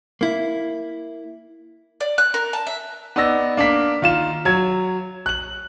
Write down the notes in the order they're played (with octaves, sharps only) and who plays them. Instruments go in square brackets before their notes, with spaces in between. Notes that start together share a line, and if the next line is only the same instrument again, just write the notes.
[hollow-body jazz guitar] A#3 E4
[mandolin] D5
F#6
A#4
A5
E5
[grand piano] B3 D#4 D5 E6 A#6
A#3 D4 A#4 B6
D#3 F4 E7
F#3 G#6
F#6 F#7